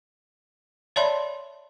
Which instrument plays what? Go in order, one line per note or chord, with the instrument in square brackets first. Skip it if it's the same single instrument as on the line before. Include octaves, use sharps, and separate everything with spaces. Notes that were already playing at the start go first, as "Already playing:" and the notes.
[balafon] C#5 D5 E5 A5 B5 C6